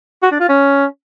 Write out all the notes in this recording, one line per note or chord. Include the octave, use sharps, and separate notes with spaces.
F#4
D4
F4
C#4